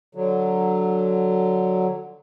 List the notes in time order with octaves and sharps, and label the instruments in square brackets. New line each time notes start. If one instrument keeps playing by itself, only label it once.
[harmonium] D3 F#3